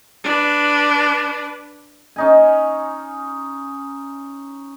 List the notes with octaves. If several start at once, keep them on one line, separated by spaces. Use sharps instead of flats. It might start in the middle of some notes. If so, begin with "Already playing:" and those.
D4 B4
C#4 D#4 G#5